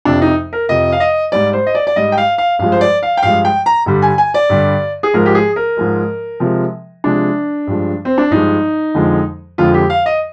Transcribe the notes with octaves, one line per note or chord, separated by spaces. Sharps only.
F2 C3 F3 D4
D#4
A#4
F2 C3 F3 D#5
F5
D#5
G#2 G3 D5
C5
D#5
D5
D5
G#2 G3 D#5
G5
F5
F5
G2 F3 G#3 F5
C5
D5
F5
G5
G2 F3 G#3 F5
G5
A#5
G2 D3 G3
G#5
G#5
D5
G2 D3 G3
G#4
G#2 F3 G#3 A#4
G4
G#4
A#4
G#2 F3 G#3
C3 F3 G#3
C3 F3 G#3 D4
G2 F3 G#3
C4
D4
G2 F3 G#3 D#4
F2 D3 F3 G#3
F2 D3 F3 G#3 F4
G4
F5
D#5